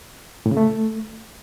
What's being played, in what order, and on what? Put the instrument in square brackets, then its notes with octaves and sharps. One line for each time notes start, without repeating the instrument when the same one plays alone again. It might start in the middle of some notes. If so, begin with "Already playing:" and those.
[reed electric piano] A2
C#3
A3